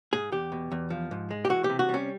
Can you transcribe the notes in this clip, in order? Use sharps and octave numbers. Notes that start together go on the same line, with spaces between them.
G#2 G#4
E2 G4
B2
E2
F3
G#2
G#3
G4
E3 F#4
G4
C3
F#4
G3 C#4